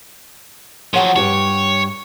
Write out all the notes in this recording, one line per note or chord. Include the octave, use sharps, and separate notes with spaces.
F3 F#3 C#5 F#5 G5
G2 G4 C#5 A5